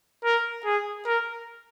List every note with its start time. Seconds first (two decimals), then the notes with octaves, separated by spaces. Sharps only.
0.24 A#4
0.65 G#4
1.06 A#4